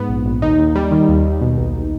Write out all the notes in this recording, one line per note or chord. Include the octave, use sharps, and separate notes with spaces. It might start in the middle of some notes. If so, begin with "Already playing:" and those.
Already playing: G#2 B3
A#1
A#1
D#2 D#4
D#2
G3
D#3
D#2
D#2
B2
B1